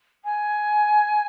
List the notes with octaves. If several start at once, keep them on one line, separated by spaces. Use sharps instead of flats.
G#5